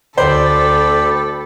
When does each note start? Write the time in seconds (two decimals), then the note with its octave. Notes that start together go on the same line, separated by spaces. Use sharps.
0.18 D2 A4 C5 D5 G5 B5